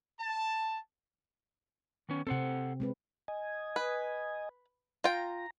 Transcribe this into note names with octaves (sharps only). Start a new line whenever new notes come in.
A5
D#3 B3 C#4
C3 C4 A4 C5 F#5
G#3 C4 B4
D#5 G#5
B4
F4 G5 A#5